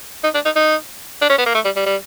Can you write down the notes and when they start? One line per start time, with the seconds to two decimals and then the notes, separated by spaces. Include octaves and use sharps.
0.24 D#4
0.34 D4
0.45 D#4
0.56 D#4
1.22 D4
1.30 C#4
1.38 B3
1.46 A#3
1.55 A3
1.65 G3
1.76 G3
1.86 G3